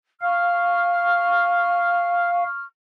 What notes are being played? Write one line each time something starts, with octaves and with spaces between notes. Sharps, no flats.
F5 C#6 F6